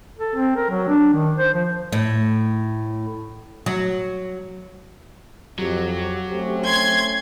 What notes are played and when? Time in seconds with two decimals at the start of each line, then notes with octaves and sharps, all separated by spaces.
0.18 A4
0.35 C4
0.56 A#4
0.70 F#3
0.88 D4
1.13 D#3
1.37 C5
1.54 F3
1.92 A2
3.66 F#3
5.59 F2 F#3 G4
6.32 A3 C4 C#4
6.67 C6 G#6